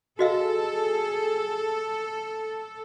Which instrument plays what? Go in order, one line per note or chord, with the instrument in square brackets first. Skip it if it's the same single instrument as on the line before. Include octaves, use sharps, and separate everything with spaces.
[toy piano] F#4 D#5 F5 [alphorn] G#4 [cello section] A4